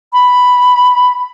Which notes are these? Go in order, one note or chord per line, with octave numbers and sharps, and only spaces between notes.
B5